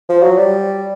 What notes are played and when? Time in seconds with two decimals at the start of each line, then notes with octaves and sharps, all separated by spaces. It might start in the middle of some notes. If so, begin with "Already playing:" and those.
0.09 F3
0.23 F#3
0.37 G3